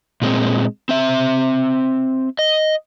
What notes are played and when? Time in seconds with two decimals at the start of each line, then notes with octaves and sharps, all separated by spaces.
0.22 A#2 G#3 C4
0.89 C4 E5
2.39 D#5